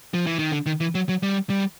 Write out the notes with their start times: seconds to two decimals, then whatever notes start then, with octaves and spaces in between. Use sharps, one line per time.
0.14 F3
0.27 E3
0.39 D#3
0.52 D3
0.66 D#3
0.80 E3
0.95 F#3
1.09 F#3
1.23 G3
1.50 G3